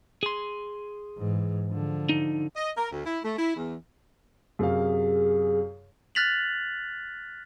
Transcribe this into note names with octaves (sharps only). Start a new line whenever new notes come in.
G#4 C6
G#2 E3
D3 F3
D#4
D#5
A#4
D2
E4
A3
E4
E2
F#2 C3 G#4 F5
F6 F#6 A6 B6 F7 F#7